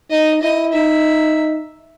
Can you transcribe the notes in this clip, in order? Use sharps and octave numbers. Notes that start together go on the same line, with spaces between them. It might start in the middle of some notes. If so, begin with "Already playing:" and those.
D#4 D#5
E4 D#5
D#4 E5